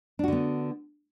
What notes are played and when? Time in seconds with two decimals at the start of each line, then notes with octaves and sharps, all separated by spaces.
0.19 D4
0.24 F#4
0.28 D3
0.32 B3